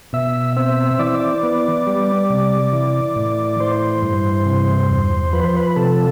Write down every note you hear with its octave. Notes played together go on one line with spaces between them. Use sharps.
B2 E5
C4 E5
E3 D5
E5
D5
B3
G3
C3
E3
A2
E3 C5
G2
C3
E2
F3 B4
C5
B4
C3 A4